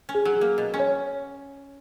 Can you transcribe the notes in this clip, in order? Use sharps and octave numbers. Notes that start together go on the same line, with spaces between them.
C#4
G#4
F#3
G#4
A#3
B2
C#4
C#5